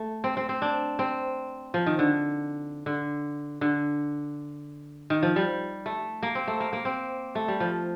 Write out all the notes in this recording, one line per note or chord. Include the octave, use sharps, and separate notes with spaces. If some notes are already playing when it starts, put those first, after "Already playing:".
Already playing: A3
C4
C4
C4
D4
C4
F3
D#3
D3
D3
D3
D#3
F3
G3
A3
A#3
C4
A3
A#3
A#3
C4
A3
G3
F3